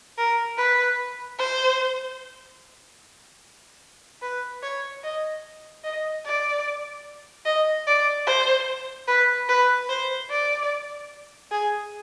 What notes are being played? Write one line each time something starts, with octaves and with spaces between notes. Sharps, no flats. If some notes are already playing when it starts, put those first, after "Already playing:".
A#4
B4
C5
B4
C#5
D#5
D#5
D5
D#5
D5
C5
B4
B4
C5
D5
G#4